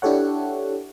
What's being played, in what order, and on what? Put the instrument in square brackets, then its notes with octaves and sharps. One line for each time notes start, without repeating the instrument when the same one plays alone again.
[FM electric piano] D4 E4 G4 A4 C#5 F#5